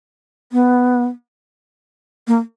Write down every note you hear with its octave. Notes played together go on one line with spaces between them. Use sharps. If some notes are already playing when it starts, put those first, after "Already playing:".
B3
A#3